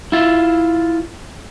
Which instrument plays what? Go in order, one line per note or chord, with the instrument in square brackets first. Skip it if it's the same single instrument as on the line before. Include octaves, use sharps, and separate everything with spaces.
[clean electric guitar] E4 F4 E5